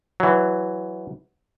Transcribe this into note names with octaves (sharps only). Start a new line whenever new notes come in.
E3 F#3